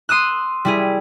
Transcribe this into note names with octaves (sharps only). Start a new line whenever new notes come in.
C6 D#6 E6 F#6
G3 E4 G#4